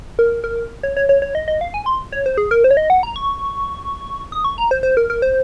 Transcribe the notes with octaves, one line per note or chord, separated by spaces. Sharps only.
A#4
A#4
C#5
C#5
C#5
C#5
D#5
D#5
F5
G#5
C6
C#5
C5
G#4
A#4
C5
C#5
D#5
F#5
A#5
C#6
D#6
C#6
A#5
C5
C5
A#4
A#4
C5